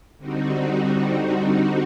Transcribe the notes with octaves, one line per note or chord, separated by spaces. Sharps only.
D3 G3 C4 D#4 F#4